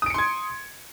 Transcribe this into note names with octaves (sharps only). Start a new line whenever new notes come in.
C6 D#6 G#6 C#7 D7